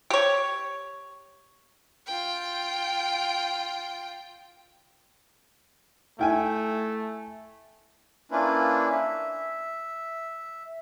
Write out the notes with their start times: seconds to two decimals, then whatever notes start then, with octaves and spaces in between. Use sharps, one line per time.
0.10 G4 C#5
2.07 F4 G5
6.19 A3 E4 G5 G#5
8.31 A#3 C#4 D4 E4 F4 B4
8.91 E5